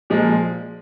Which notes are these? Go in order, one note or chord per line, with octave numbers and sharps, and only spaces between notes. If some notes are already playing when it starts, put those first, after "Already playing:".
A#2 F3 G#3